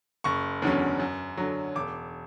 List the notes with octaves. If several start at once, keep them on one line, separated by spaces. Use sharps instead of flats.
F#1 C#6
E2 D3 F#3 C#4
F#2
D3 F#3
E1 D6